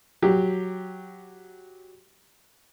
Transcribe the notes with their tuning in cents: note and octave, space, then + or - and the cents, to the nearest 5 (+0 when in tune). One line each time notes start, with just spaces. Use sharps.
F#3 +0 G4 +0